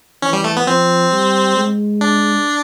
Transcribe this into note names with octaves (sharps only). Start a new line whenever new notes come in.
E3 C#4
G3
A3
B3
F3 C4
G3
G#3
D4